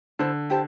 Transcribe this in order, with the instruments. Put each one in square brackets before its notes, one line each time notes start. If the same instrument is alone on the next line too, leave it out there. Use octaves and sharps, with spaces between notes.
[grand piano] D3 [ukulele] E4 C5 A5
[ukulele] E4 G4 C5 A5